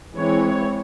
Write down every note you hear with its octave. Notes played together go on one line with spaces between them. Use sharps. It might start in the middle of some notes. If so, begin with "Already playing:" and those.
E3 G#3 C4 C#5